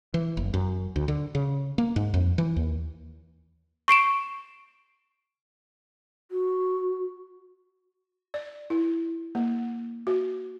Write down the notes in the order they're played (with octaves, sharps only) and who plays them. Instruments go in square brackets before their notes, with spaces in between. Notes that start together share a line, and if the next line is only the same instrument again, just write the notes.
[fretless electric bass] E3
F#1
F#2
D2
D3
C#3
A#3
G#2
F2
E3
D#2
[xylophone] C#6 C7 D7 E7
[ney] F#4
[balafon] D5
E4
A#3
F#4